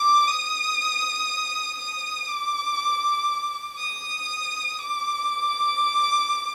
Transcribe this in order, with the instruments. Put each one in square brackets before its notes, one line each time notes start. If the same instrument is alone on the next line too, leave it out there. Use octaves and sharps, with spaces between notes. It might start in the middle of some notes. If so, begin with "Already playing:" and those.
Already playing: [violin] D6
D#6
D#6
D6
D#6
D6